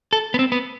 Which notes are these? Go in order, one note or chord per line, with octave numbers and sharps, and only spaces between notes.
A4
B3
C4
B3